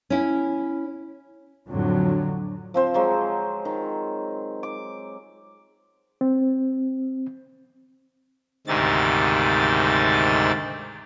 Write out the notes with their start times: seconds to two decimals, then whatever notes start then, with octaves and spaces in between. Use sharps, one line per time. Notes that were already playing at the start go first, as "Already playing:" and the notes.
0.10 C#4 E4
1.68 F2 A2 D3 F#3
2.74 F3 C4 C5
2.94 F3 F#3 G#3
3.65 D#3
4.63 D6
6.21 C4
8.67 D2 G#2 C3 D#3 A6